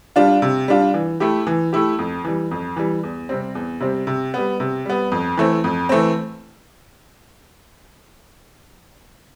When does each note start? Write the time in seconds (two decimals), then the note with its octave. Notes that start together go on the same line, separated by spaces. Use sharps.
0.16 G3 D4 F4
0.42 C3
0.68 G3 D4 F4
0.94 E3
1.20 A3 E4 G4
1.47 E3
1.73 A3 E4 G4
1.99 F2
2.25 E3 G3
2.51 F2
2.77 E3 G3
3.03 E2
3.29 C3 G3 C4
3.55 E2
3.80 C3 G3 C4
4.07 C3
4.34 G3 B3
4.60 C3
4.86 G3 B3
5.12 F2
5.37 E3 A3 C4
5.64 F2
5.89 E3 A3 C4